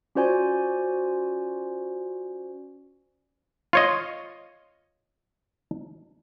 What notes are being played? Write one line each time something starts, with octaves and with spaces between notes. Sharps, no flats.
C#4 F4 F#4 C5 D5 G#5
F4 C#5 D#5